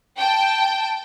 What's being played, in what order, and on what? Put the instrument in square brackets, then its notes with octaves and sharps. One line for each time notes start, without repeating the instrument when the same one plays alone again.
[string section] G5 A5